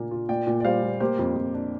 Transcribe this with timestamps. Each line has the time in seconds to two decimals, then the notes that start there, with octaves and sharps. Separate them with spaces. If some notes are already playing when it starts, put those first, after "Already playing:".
Already playing: A#2 A#3 D4 F4
0.11 F4
0.29 A#2 D5 G5
0.47 A#2
0.60 D5
0.65 G3 C5 F5
0.83 A#2
1.00 A#3 G4 C5
1.19 F2
1.36 F2
1.54 D4